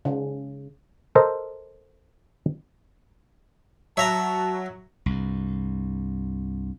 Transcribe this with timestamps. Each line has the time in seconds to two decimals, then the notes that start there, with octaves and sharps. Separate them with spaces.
0.05 C#3
1.15 A4 A#4 C5 D#5 A#5
3.97 F#3 E5 A5 A#5
5.06 C2 G2